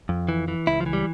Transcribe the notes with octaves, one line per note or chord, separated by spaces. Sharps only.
F2
E3
E3
C#2 E4
F3
E3
G3